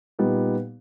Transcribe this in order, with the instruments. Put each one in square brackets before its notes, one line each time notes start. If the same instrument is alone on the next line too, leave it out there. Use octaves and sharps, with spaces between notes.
[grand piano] A#2 G3 B3 D#4 G4